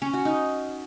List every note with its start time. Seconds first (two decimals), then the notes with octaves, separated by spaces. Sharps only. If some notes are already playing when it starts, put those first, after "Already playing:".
0.02 C#4
0.13 F#4
0.25 D#4